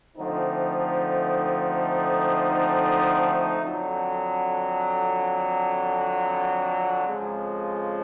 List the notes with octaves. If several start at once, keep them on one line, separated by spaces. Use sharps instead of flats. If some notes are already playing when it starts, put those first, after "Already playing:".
D3 F3 A3 C4 D#4
F2 D3 F#3
F2 C#3 F3 G#3